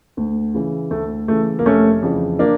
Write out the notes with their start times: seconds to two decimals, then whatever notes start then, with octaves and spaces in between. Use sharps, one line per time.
0.17 D2
0.54 C#3 E3
0.91 D2 A3
1.28 C#3 E3 A3
1.59 A#3
1.66 F1 A3 C#4
2.02 F2 C#3 E3
2.39 A#3 D4